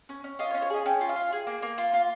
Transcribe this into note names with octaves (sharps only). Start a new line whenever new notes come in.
C#4
C#4
F4 D#5
C#5
C#4
C#5
G#4 D#5
C#4 G5
F4
F5
F4
G#4
A#3
A#3
F4
F4